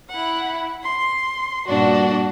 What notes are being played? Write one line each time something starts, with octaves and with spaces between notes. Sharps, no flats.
E4 F#5
C6
G2 A#2 D4 F#4